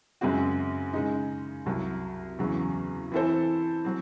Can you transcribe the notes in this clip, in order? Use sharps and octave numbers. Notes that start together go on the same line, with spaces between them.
F#2 C#3 G#3 C4 F#4
C#3 G#3 D#4
C2 C3 F#3
E2 C#3 F#3
E3 C4 E4 A4 C5
F#3 C4